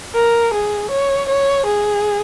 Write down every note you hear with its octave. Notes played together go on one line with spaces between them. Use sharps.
A#4
G#4
C#5
C#5
G#4